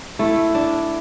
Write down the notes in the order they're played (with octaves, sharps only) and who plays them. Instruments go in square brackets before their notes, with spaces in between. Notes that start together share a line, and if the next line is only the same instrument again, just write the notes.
[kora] A3 [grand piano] E4
[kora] D4